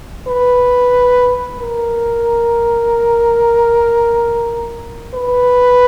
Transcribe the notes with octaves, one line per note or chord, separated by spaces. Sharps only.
B4
A#4
B4